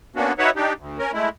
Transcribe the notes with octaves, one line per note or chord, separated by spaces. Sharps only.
A#3 B3 C#4 D4 F#4
D#4 F#4 B4 C#5 E5 F#5
D4 D#4 G4
D2
C#4 A#4
G#3 A3 E4